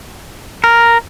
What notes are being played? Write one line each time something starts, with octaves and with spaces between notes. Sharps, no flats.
A#4